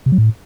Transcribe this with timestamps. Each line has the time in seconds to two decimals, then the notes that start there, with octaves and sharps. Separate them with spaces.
0.06 C3
0.12 F#3
0.18 A2